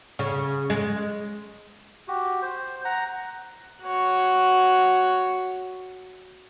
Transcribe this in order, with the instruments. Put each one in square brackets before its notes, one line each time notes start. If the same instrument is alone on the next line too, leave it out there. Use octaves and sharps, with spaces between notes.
[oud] C#3
G#3
[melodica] F#4 G4
C5
F#5 A#5
[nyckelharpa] F#4 C#5